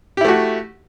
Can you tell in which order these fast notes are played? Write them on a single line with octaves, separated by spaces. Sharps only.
G4 E4 A3 F#4